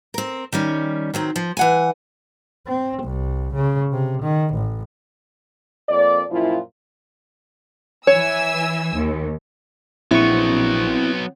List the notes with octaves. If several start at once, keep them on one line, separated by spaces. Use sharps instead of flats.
C4 A#4
D#3 G3 C#4
D#3 F#3 C4
F3
E3 F#5 G#5
C4
C2
C#3
C3
D#3
A1
F2 A#3 D5
F#2 A#2 F3 E4 F4
E3 C#5 G#5 E6
D#2
A#1 F#3 B3 C4 E4 C#6